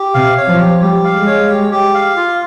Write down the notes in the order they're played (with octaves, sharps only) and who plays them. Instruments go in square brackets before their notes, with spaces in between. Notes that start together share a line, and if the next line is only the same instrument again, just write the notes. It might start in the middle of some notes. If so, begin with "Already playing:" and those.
Already playing: [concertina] G4
[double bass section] C3 [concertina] F5
[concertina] C#5
[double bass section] F3
[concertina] G4
[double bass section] G3 [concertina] G4
[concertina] F5
[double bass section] G#3
[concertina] C#5
G4
G4
F5
F4